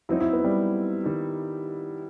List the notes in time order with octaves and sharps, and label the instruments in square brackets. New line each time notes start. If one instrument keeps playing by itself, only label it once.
[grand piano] F#3 C4 D#4 [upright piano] E4
[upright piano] E4
B3
G3
[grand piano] D#3 G3 D#4